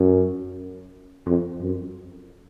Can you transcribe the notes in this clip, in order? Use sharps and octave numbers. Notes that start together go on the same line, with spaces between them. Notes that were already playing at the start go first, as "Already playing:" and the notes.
Already playing: F#2
F2
F#2